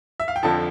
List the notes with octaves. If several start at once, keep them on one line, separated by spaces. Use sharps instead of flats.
E5
F5
G5
F2 D3 F3 A5